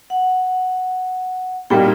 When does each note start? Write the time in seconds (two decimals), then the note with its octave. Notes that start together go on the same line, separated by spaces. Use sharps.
0.10 F#5
1.70 A#2 G3 A#3 D#4 G5